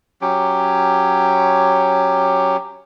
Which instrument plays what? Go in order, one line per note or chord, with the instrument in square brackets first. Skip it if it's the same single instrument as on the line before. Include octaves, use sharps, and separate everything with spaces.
[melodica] F#3 C#4 G4